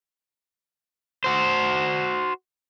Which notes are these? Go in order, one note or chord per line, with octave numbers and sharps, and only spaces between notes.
F#4 C5